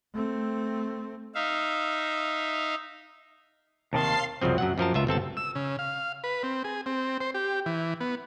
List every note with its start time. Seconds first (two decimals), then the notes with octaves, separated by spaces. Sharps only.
0.14 A3 C4
1.35 D#4 E5 F5
3.93 D#2 C3 D#3 F5 A5 C6 C7
4.42 C2 F#2 C#3 F3 C4
4.58 F#2 F#3 F#5
4.78 F#2 F3 A#4 A5
4.94 C#2 F4 E5
5.07 G1 C4 A4 A5
5.37 E6
5.55 C#3
5.79 F5
6.24 B4
6.43 C4
6.64 G#4
6.86 C4
7.20 C5
7.34 G4
7.66 E3
8.01 B3